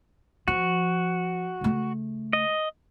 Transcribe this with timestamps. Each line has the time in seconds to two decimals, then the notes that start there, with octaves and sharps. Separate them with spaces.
0.48 F3 F#4
1.61 C#3 A3
2.33 D#5